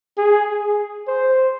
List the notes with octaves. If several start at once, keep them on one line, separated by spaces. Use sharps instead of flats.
G#4
C5